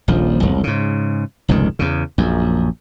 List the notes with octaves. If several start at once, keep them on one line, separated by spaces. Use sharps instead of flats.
D#1 A#1 F3
E1 C2
G#2 C#3
F1 C#2 G#2 D#3
E2 C#3
A#1 F#2